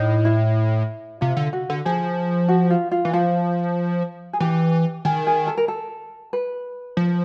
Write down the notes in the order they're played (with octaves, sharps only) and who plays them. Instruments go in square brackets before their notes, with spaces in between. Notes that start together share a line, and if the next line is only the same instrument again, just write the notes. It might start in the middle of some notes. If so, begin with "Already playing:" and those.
Already playing: [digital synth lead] A2 [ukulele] D#4
[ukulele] E4
[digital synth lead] C3 [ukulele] F4
[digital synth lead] D3
[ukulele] F#4
[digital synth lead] D3
[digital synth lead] F3 [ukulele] G#4
[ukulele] F#4
F4
F4
[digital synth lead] E3
[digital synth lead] F3 [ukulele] F4
[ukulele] G#4
[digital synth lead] E3 [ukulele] G4
[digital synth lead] D#3 [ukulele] G#4
[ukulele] G#4
A4
A#4
A4
B4
[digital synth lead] F3